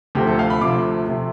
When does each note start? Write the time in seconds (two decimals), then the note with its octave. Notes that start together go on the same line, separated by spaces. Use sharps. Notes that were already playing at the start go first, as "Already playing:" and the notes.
0.15 D2 C3 F3 A3 G4
0.27 A4
0.39 F5
0.50 B5
0.61 D2 C3 F3 A3 D6
1.08 C3 F3 A3